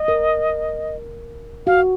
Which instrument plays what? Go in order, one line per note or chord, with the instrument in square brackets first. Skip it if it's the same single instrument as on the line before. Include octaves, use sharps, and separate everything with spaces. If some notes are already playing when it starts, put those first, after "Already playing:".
Already playing: [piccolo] D#5
[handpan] A#4
[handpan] F#4 [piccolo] F5